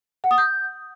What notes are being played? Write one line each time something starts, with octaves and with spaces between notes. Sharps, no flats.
F#5
D#6
G6